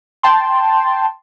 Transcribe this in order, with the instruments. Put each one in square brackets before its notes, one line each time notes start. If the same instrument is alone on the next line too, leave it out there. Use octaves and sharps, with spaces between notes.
[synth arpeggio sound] G5 A5 C6